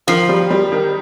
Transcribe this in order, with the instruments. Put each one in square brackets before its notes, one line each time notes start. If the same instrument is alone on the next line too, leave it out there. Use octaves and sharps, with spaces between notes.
[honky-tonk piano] D#3 [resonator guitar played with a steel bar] F3
[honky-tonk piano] G3
G3
D#3